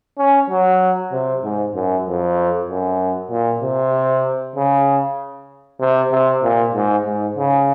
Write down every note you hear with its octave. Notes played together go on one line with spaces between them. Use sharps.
C#4
F#3
C3
G#2
F#2
F2
F#2
A#2
C3
C#3
C3
C3
A#2
G#2
G#2
C#3